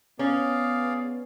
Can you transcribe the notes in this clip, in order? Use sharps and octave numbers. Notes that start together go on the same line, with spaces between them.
B3 C#4 G#4 D5 F5